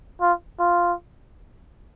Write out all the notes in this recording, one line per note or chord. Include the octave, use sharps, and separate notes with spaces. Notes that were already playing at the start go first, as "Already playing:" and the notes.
F4
F4